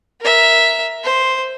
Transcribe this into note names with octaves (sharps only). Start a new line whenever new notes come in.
A#4 E5
C5